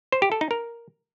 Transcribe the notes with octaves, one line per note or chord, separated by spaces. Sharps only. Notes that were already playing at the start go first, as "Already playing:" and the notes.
C5
G4
A4
D#4
A#4